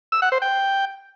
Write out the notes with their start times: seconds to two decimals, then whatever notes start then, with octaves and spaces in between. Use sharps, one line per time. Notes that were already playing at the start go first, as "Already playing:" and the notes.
0.12 E6
0.22 F#5
0.32 C5
0.42 G5